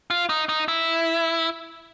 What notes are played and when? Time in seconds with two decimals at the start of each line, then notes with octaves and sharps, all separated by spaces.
0.10 F4
0.29 D#4
0.49 D#4
0.68 E4